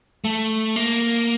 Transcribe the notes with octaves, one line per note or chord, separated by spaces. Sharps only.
A3
A#3